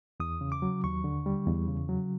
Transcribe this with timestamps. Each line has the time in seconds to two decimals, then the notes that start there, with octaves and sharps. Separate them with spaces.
0.20 E2 D#6
0.41 C#3
0.52 D6
0.62 F#3
0.84 D#2 C#6
1.04 D3
1.26 G3
1.46 E2
1.68 C#3
1.89 F#3